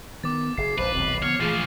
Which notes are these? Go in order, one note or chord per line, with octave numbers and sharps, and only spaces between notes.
D#3 B3 D6 A6
F#1 G#4 C7
A#1 G#2 B4 C5
D#1 B1 C4
D3 F3 B3 C#5 F6
A#2 E3 F3 A3 G#4 A6 D#7